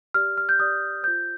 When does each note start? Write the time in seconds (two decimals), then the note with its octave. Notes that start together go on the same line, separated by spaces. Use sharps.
0.14 G4 D5 F6
0.38 F6
0.49 G6
0.59 G4 D5 D#6
1.03 C5 G6
1.07 F4